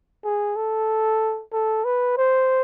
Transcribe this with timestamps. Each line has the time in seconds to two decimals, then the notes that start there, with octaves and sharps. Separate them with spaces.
0.25 G#4
0.56 A4
1.53 A4
1.85 B4
2.17 C5